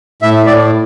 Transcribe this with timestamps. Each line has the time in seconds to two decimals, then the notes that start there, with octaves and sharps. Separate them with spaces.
0.22 A2 E5
0.46 A2 D5